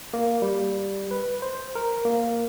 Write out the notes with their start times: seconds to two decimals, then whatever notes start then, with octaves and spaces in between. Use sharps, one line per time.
0.13 A#3
0.42 G3
1.11 B4
1.42 C5
1.75 A#4
2.05 A#3